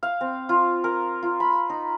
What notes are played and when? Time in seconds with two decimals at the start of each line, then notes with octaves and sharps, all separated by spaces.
0.03 F5
0.21 C4
0.49 F4
0.84 A#4
1.23 F4
1.40 B5
1.70 D#4